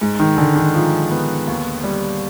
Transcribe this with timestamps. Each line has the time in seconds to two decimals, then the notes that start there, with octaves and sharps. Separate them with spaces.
0.01 G#2
0.20 D#3
0.37 D3 G#3
0.56 D#3
0.74 F3
1.11 B3
1.47 D#2
1.84 G3